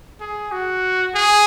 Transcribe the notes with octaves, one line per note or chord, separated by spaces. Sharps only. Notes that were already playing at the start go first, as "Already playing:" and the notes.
G#4
F#4
G#4